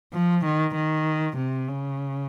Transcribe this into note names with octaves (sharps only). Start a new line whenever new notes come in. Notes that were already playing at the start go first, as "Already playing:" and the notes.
F3
D#3
D#3
C3
C#3